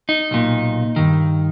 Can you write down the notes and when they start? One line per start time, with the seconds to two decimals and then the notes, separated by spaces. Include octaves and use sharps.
0.09 D#4
0.31 B1 A#2
0.96 G2 D#3